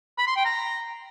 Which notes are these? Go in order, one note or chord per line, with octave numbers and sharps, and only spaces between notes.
B5
C6
G5
A#5